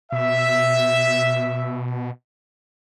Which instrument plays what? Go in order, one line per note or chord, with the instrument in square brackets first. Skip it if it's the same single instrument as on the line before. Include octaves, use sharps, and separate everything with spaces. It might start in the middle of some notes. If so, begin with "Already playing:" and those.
[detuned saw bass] B2 [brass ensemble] E5